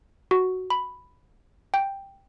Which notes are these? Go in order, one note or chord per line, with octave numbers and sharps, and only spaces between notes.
F#4
B5
G5